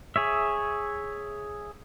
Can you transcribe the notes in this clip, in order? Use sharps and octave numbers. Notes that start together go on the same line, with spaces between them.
G#4 C#5 E5